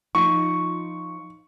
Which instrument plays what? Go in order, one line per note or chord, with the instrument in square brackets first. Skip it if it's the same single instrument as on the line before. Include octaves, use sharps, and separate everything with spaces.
[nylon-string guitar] F3 D#4 F4 [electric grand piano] C#6